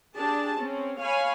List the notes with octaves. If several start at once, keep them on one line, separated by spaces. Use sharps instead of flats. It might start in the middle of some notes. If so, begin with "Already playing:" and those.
D4 G4 G#4 A5
C4 C#4
C#5 F5 G#5 B5